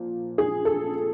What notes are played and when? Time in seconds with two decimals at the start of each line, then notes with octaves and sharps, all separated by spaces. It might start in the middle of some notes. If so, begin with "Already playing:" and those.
Already playing: A#2 F3
0.38 G#4
0.65 A4